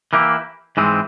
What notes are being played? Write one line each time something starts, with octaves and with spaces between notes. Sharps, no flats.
E3 A#3 E4 G4
G#2 E3 G#3 C4